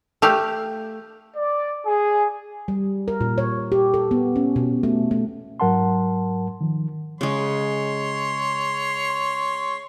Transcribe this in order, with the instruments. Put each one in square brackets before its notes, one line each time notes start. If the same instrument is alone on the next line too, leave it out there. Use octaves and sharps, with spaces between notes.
[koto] A3 G4 F5
[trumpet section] D5
G#4
[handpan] G3
A#4
A#2
C#5
G4
A4
B3
C#4
B2
A3
A3
[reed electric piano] G#2 F#3 A#4 F#5 A5 C6
D#3 F3
[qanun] C#3 G#3 [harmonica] C#5 C6